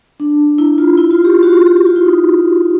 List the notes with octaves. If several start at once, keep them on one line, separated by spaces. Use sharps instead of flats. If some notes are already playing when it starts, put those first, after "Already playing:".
D4
E4
F4
E4
F4
G4
F#4
F4
F#4
G4
F#4
F4
E4
D#4